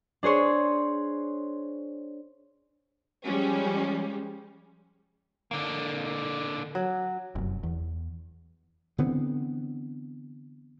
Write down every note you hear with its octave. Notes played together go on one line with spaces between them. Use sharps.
D4 G#4 C5 C#5 C6
F3 G3 G#3 C#4
D3 A#3
F#3
F1 F#2
E2
D3 E3 B3 C4